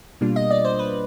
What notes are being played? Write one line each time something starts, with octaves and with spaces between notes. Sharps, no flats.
B2 G3 A#3 D4 F4
D#5
D5
C5
B4